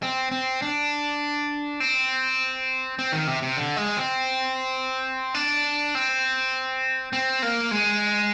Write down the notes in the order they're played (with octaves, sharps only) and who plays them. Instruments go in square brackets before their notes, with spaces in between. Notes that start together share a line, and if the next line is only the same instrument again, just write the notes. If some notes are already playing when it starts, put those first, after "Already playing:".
[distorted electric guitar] C4
C4
D4
C4
C4
D#3
C3
C3
D3
G#3
C4
D4
C4
C4
A#3
G#3